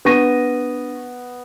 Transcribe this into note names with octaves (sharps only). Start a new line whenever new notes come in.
B3 D4 C#6 A#6 D#7